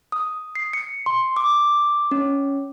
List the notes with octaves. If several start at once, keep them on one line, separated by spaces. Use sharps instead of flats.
D#6
C7
C#7
C6
D6
C#4